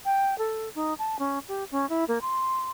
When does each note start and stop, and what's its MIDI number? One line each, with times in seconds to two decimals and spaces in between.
0.05 0.37 79
0.38 0.69 69
0.75 0.94 63
0.99 1.16 81
1.19 1.39 61
1.48 1.64 67
1.71 1.88 61
1.89 2.04 64
2.08 2.19 58
2.21 2.71 84